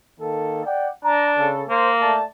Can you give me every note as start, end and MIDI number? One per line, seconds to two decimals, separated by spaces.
0.20 0.61 51
0.20 0.61 58
0.20 0.61 69
0.66 0.89 74
0.66 0.89 78
0.66 0.89 79
1.05 1.49 62
1.05 1.27 82
1.38 1.64 49
1.38 1.64 69
1.69 2.14 58
1.69 1.91 72
2.01 2.24 57
2.01 2.24 74
2.01 2.24 81